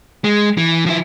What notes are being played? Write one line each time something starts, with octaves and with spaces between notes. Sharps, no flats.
G#3
E3
F3 E4